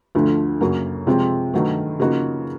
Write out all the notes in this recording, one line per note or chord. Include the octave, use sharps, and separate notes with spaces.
D2 D3 F3 A3
F#2 C#3 F#3 A#3
C3 F3 G#3 C4
G2 D#3 F#3 A3
C#3 F3 A#3 D#4 F#4